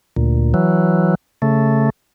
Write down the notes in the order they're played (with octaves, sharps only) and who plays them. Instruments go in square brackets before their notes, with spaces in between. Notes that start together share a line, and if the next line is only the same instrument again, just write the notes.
[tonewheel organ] D2 A#2
E3 F#3
C#3 A3